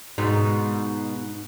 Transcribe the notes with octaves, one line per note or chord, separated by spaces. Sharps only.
G#2 B2 D#4